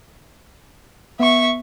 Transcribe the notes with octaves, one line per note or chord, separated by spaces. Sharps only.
B3 E5 C#6